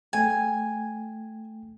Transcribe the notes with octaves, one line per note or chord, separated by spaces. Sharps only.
A3 G5 G#5